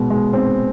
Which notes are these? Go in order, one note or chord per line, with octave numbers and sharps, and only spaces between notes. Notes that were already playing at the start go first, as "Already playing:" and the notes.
Already playing: B2 G#3
G#3
C4